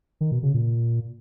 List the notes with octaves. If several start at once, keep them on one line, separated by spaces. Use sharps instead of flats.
D#3
B2
C#3
A#2